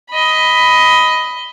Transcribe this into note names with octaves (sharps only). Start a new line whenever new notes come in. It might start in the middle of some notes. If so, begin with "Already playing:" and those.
D#5 B5